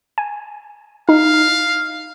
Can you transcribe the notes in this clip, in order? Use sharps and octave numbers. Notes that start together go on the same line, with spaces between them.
G#5
D#4 F5